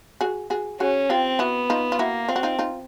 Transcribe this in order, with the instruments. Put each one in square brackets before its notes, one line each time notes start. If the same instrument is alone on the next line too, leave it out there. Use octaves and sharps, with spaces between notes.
[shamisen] F#4 G#4
F#4 G#4
[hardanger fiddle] C#4 [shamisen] F#4 G#4
[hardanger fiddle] C4 [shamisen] F4 G4
[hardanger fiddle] B3 [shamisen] E4 F#4
[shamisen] D#4 F4
F4
[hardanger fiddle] A#3 [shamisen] E4 F#4
[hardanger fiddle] C4 [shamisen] F4
[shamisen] F#4
D#4 F4
D#4 F4